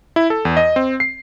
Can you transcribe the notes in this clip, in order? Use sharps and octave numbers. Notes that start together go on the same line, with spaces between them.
E4
A4
E2
D#5
C4
C7